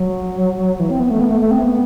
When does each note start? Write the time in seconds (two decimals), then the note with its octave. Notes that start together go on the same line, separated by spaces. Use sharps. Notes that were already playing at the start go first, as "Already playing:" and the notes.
Already playing: F#3
0.80 E3
0.90 C4
1.00 B3
1.10 A3
1.21 B3
1.31 A3
1.41 A3
1.51 C4
1.61 B3